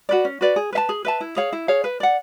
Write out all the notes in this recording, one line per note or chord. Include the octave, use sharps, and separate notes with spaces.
F#4 B4 D5
C#4
F#4 B4 D5
G#4
B4 E5 A5
G#4
B4 E5 A5
E4
G#4 C#5 F5
E4
G#4 C#5 F5
B4
D5 F#5